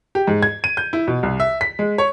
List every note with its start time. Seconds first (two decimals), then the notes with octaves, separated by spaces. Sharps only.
0.15 G4
0.27 G#2
0.43 G#6
0.64 D#7
0.77 G6
0.93 E4
1.07 B2
1.23 C2
1.40 E5
1.61 B6
1.79 G#3
1.98 C#5